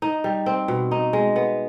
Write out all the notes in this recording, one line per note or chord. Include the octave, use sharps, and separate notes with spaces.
D#4
G3
C4
B2
D#4
G#3
B3